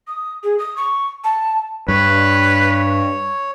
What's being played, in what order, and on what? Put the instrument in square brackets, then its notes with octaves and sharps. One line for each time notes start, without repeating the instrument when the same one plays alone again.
[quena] D#6
G#4
D#6
C#6
A5
[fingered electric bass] G2 [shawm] B4 [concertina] C#5